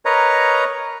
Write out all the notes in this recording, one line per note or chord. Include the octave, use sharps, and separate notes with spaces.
A#4 B4 C#5 D#5 A#5